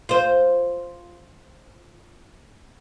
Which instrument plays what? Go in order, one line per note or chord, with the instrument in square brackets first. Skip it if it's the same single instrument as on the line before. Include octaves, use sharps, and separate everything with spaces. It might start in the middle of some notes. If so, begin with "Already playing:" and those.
[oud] F4 C5